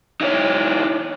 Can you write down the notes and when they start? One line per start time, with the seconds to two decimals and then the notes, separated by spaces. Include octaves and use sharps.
0.21 D#4 E4 A4 C#5